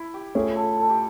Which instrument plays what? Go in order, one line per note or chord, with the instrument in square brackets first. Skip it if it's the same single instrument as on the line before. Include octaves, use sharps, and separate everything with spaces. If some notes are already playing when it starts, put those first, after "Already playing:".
Already playing: [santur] E4
G4
[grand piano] A3 C#4 F4 [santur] G#4
[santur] A4
A4
G4